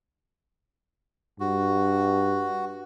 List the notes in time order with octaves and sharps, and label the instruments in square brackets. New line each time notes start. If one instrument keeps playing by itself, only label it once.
[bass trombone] G2 [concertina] F#4